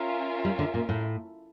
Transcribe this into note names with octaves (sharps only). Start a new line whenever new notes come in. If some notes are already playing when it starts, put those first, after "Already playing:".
Already playing: C#4 F4 A#4 E5
G3
D3
A#2
A2